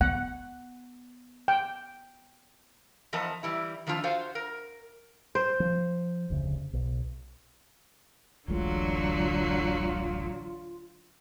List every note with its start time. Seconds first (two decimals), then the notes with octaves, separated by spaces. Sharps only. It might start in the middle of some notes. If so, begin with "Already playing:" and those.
0.01 B3 F#5
1.48 G5
3.13 E3 F3 B3 A#4 D#5 A5
3.43 E3 G3 E4
3.87 D#3 F3 A3 D4 F4
4.04 F4 F#4 C5 F5
4.35 A#4
5.35 C5
5.60 F3
6.30 F1 D2 C#3
6.73 B1
8.48 D1 A1 D3 F#3 G#3 F4